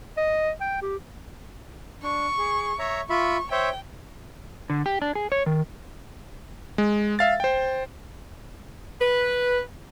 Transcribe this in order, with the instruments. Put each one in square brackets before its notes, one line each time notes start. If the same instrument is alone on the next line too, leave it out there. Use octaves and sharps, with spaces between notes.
[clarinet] D#5
G5
G4
[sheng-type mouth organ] D4 [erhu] C#6
[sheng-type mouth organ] G#4
C#5 E5 A#5
[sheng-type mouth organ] F4 E5 B5 [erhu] C#6
[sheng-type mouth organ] C5 C#5 E5 [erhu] G5
[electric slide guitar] D3
G4
D4
G#4
C#5
D#3
[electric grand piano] G#3
E5 F5 A6
C5 G5
[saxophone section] B4